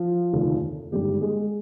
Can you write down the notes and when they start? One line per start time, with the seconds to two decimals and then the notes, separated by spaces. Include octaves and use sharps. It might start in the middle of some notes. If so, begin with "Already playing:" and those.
Already playing: F3 F4
0.33 F1 D#2 D3
0.92 G#1 G2 D3 G3 G4
1.21 G#3 G#4